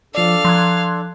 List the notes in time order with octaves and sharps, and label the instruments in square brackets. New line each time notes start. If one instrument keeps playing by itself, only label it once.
[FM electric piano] F3 D5 [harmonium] D4 A4 [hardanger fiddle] F5
[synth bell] F3 [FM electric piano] C6 F#6 G#6